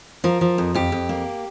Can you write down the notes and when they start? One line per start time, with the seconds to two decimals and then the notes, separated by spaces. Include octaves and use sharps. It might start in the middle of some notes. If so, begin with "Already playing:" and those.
0.24 F3 A#4
0.41 F3
0.58 F2
0.74 F2 G4
0.92 F2
1.09 A#3